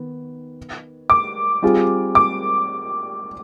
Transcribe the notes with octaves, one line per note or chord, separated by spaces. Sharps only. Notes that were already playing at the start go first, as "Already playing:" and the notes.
Already playing: D#3 B3
D6
G3 C4 F4 G#4
D6